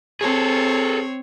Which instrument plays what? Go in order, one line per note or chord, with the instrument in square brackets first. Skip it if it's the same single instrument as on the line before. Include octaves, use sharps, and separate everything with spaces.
[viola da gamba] C4 C#5 [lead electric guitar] G#4 A4